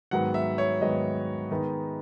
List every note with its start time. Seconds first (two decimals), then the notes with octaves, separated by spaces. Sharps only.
0.11 G#2 D#3 F#3 B3 F#5
0.34 E5
0.58 C#5
0.81 G#2 D#3 F#3 B3 D#5
1.51 D#3 G#3 B3 D#4